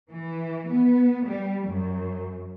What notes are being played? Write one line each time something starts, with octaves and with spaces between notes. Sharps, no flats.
E3
B3
G3
F#2